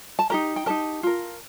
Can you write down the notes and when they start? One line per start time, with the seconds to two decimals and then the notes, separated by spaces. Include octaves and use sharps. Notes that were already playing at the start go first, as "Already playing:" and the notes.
0.19 A5
0.30 D#4 G4 A#4 A#5
0.56 G5
0.66 D#4 G4 A#4 A5
1.03 F4 A#4